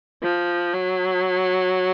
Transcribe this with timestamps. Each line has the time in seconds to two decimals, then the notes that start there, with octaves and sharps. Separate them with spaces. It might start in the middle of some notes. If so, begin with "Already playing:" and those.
0.23 F3
0.73 F#3